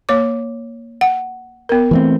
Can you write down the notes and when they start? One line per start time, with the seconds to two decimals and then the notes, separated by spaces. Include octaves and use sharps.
0.09 A#3 C#5 D6
1.01 F#5
1.69 B3 A#4
1.91 E3 A3 C4